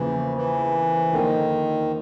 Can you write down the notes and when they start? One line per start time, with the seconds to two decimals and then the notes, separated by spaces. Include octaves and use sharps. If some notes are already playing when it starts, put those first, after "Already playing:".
Already playing: E2 C#3 E3 F3 A#3
0.37 E3
1.13 D3 D#3 F3 A#3 D#4